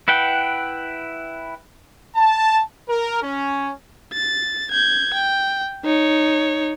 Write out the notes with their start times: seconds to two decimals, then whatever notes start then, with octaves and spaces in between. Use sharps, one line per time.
0.08 E4 B4 F#5 G5
2.16 A5
2.88 A#4
3.22 C#4
4.13 A6
4.71 G6 G#6
5.14 G5
5.85 D#4 C#5